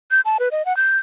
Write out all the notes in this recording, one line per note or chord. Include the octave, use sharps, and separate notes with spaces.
G6
A5
B4
D#5
F#5
G6